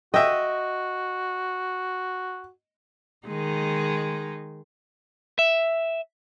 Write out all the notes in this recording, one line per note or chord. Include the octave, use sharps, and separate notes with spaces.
F#4 D#5 E5 G5
D#3 G#3 D#4
E5